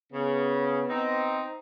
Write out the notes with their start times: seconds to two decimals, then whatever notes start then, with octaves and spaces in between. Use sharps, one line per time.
0.13 C#3 B3
0.89 C4 D#4